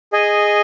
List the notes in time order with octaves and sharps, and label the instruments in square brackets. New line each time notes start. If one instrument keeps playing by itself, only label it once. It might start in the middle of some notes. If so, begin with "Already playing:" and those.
[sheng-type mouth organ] G#4 D#5 G#5